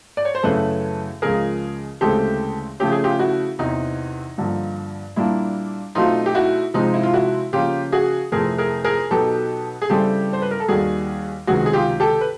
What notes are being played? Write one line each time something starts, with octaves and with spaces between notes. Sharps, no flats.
D5
C#5
C5
F#2 C#3 E3 A3 C#4 A4 B4
C#2 C#3 F3 G#4 A#4
D2 C#3 E3 G#3 C4 G4 A4
C#3 F3 A3 C#4 G4
G#4
F4 G4
E4 F#4
E2 C3 E3 D#4
G2 D3 F3 A#3
A#2 G3 A#3 D4 E4
B2 F#3 A3 C4 D#4 F4
G4
E4 F#4
C3 F3 G#3 C4 D#4 F4
E4
F4
E4 F#4
C#3 F3 A#3 C#4 F4 G4
F#4 G#4
F2 C3 E3 A3 C4 G#4 A#4
G#4 A#4
G#4 A#4
B2 F#3 B3 D#4 G4 A4
G#4
C#3 E3 G3 C4 G4 A4
C5
B4
A#4
A4
D#2 D#3 G3 F#4 G#4
C#2 C3 D#3 F#3 B3 F#4 G#4
G#4
F4 G4
G4 A4
B4